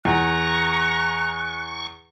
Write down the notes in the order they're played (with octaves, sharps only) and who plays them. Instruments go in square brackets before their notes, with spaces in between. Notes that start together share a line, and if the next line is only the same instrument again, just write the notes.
[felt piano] E2 [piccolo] A#5 [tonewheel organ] C#6 [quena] F#6